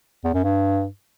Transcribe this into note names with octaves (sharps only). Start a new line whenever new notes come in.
E2
F#2
G2